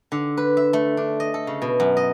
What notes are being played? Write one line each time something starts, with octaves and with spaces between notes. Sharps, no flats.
D3
B4
E5
A3
D4
D#5
A4
C#3
B2
F#2
D#5